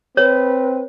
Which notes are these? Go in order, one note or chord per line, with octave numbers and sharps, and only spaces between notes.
C4 B4 C#5